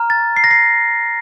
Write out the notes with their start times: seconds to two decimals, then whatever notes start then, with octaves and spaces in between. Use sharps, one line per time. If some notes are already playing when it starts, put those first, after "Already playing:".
Already playing: A#5 F6
0.10 A6
0.37 C7
0.44 A#6
0.51 C7